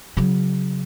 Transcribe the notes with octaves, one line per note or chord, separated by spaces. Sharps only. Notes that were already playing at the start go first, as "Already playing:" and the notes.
C#3 F#3